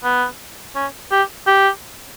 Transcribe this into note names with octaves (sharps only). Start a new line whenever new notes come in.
B3
C#4
G4
G4